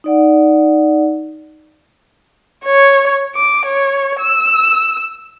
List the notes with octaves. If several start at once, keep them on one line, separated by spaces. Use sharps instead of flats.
D#4 D5 F#5
C#5
D6
C#5
E6